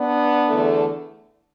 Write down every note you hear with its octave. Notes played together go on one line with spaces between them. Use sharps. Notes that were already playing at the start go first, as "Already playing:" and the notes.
Already playing: B3 D4
E2 D3 A3